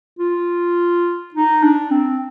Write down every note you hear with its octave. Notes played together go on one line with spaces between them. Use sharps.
F4
D#4
D4
C4